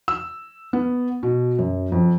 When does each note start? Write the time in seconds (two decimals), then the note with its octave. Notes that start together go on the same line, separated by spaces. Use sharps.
0.08 E6
0.73 B3
1.23 B2
1.59 F#2
1.92 F2